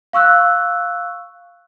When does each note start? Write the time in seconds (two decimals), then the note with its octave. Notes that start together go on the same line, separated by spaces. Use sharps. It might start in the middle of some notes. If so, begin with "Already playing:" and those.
0.13 F5 C#6 E6 F#6